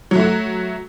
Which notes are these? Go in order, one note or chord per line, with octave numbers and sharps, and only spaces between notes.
F#3 A3 F#4